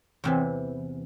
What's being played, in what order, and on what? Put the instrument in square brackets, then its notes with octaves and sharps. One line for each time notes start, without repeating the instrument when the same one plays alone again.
[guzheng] E2 C3 E3 [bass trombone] C4